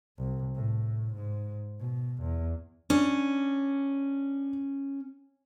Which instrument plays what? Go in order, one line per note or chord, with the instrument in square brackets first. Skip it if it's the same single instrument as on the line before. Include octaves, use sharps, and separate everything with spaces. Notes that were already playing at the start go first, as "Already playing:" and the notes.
[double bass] C2
A2
G#2
B2
E2
[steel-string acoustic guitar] C#4 [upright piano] D4